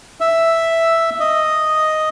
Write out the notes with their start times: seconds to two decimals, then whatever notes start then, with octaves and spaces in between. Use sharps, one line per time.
0.21 E5
1.20 D#5